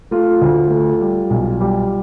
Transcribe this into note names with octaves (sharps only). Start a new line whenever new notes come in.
A3 F4
D2
A3
G3
B1
G3